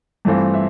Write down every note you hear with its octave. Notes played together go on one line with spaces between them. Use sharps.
G2 E3 A3 C4 F4
E5